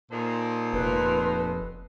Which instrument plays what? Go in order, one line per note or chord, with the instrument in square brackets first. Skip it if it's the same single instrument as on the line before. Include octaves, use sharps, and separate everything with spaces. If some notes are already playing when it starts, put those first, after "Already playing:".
[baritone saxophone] A#2 [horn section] D#3 A4 C5
[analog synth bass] F1 [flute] B4